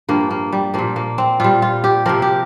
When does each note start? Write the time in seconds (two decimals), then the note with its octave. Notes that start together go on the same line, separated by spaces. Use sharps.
0.08 G2 F3 A#3
0.31 A#3
0.52 G3
0.74 A#2 F3 A#3
0.96 A#3
1.18 C4
1.40 A#2 G3 F4
1.62 F4
1.84 G4
2.06 C3 F3 A#4
2.22 G4